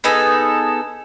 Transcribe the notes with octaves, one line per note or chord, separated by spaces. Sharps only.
B3 D#4 G#4 A4